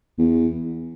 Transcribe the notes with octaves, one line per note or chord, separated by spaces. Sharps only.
E2